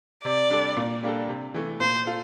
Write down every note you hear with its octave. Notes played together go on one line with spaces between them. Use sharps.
C3 D5
G3 D4 A4
A#2
G3 A#3 D4 A4
C3
E3 A3
A#2 C5
F4 A4